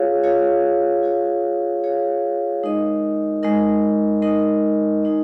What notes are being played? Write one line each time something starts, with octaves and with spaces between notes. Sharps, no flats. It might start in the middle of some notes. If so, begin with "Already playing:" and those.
Already playing: F4 G#4 C#5 F5
F4 G#4 C#5 F5
F4 G#4 C#5 F5
F4 G#4 C#5 F5
G#3 D#4 A#4 D#5
G#3 D#4 A#4 D#5
G#3 D#4 A#4 D#5
G#3 D#4 A#4 D#5